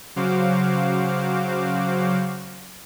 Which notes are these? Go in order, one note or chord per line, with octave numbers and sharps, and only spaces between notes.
C#3 F#3 F#4 C5 F5 D6